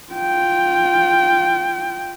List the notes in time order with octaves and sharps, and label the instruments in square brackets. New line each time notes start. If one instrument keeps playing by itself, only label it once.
[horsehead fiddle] F4 G5